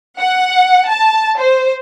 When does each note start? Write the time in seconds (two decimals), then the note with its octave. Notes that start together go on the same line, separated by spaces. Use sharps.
0.19 F#5
0.88 A5
1.37 C5